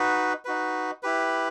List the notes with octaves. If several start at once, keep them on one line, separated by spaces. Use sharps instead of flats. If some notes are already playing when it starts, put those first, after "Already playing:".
Already playing: D#4 F#4 B4
D#4 F#4 B4
E4 G4 B4